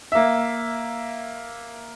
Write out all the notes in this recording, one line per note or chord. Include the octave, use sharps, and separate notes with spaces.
A#3 E5